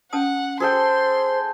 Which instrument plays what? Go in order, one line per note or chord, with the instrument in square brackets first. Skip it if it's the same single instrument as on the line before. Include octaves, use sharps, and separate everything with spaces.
[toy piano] C#4 A5 D#6 [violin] F#5
[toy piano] F#4 [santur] G#4 A4 G5 [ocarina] C5 [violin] C6